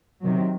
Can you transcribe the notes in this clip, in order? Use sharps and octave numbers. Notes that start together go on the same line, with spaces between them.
C3 D#3 F#3